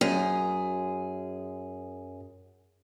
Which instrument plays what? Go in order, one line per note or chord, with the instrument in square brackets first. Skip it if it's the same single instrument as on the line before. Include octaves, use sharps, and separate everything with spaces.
[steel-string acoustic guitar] F#2 G#4